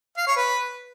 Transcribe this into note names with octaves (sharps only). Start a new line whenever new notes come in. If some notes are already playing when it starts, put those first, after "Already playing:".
F5
C#5
B4